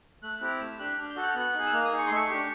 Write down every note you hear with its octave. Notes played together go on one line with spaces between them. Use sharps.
A3 F#6
F#6
C4 E4 G4
F6
A3 E6
D4 G4 F#6
D4 F6
G6
F#4 A4
F#6
F6
B3 F#6
D#4 G#4
E6
A#3 F6
D#6
D#4 G#4
C#6
A3 C6
C#6
D4 G4